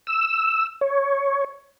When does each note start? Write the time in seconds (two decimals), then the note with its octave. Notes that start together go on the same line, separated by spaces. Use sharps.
0.07 E6
0.81 C#5